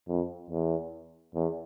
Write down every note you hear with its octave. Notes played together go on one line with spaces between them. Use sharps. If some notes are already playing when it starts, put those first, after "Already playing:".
F2
E2
E2